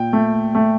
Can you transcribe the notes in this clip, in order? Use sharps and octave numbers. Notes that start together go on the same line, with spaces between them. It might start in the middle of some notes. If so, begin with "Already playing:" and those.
Already playing: A#2 G5
A3
A3